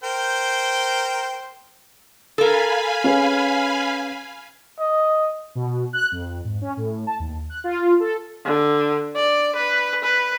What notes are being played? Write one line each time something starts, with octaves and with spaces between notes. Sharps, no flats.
A#4 C5 G5
A4 A#4 F5 G#5 B5
C#4 G#4 B4
D#5
B2
F#6
F2
G#2
C#4
A2
A5
D#2
F#6
F4
A4
D3
D5
B4
B4